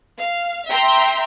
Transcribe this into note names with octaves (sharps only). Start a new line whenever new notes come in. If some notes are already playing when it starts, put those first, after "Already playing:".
F5
E5 G5 A#5 C6